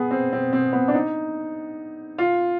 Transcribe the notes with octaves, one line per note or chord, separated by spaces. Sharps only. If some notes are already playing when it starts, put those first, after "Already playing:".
Already playing: B3 G#4
C4
C4
C4
B3
D4
D#4
F4